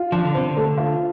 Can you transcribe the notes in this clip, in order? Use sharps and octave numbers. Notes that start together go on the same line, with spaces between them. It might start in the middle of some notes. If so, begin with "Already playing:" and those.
Already playing: F4
F3 D4
D3
C3 C5
D3
A3
F4